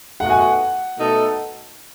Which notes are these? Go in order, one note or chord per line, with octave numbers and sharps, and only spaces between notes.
B2 A3 D#4 F#4 F#5
G#5
F#5
B2 A3 D#4 A4